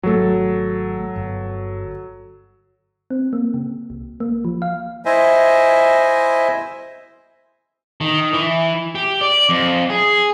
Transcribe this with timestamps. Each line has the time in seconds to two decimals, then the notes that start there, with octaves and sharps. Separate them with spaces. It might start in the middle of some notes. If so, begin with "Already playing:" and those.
0.03 G#1 F#3 A3 A4
1.16 G1
3.10 C4
3.33 A#3
3.54 C#3
3.90 C2
4.20 A#3
4.45 F3
4.62 F5
5.05 E4 C5 D#5 E5 G#5
8.01 D#3
8.33 E3
8.95 G4
9.21 D5
9.49 F2
9.90 G#4